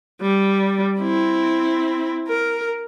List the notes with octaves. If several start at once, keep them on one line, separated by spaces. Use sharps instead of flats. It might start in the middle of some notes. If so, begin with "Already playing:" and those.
G3
C4 E4
A#4